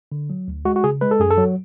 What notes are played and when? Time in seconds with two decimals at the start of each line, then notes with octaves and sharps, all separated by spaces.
0.12 D3
0.30 F#3
0.48 D2
0.65 G#3 F#4
0.76 F#4
0.84 C#3 G#4
1.01 G#3 B4
1.11 A4
1.20 F#2 G#4
1.31 A4
1.37 F#3